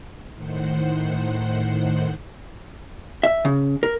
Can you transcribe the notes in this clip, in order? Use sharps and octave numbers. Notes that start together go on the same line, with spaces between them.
A2 D#3 C5 F#5
E5
C#3
A#4